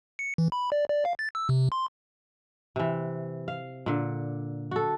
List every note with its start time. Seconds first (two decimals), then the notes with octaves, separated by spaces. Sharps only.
0.19 C#7
0.38 E3
0.52 B5
0.72 D5
0.89 D5
1.05 F5
1.19 A6
1.35 E6
1.49 C3
1.72 C6
2.76 C3 E3
3.48 F5
3.86 A#2 D3
4.71 F#4 A4